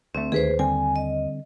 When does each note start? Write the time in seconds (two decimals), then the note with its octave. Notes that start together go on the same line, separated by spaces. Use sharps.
0.15 D2 A3 C4
0.32 D#2 G#4 B4 C5
0.59 D3 G3 C4 G#5
0.96 D#5